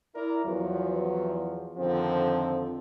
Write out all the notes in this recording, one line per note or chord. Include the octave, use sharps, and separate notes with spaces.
E4 A#4 D5
E2 F3 F#3
F2 D3 D#3 F3 C4